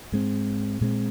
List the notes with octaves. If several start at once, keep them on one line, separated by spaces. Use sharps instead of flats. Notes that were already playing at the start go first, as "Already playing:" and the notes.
G#2 G#3 C4
A#2 G#3 C4